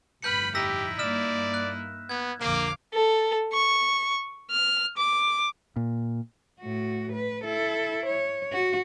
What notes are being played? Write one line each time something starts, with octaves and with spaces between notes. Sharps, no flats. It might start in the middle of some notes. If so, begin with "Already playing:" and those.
G1 F2 A2 B4 B5 F6 G6 C#7
D#4 E4 G4 E6 A#6 B6
G2 A#3 D5 F6 E7
F#6
B3 G#6
A#1 F2 D3 A#3 F5 D6
A4
C#6
F6
D6
A#2
A2 F#4
B4
E4 A4
C#5
F#4